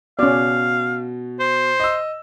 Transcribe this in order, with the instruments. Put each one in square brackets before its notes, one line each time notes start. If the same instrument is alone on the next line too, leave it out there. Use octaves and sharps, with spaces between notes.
[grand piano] B2 [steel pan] C#4 D5 [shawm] F5
[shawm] C5
[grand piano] D#5 E6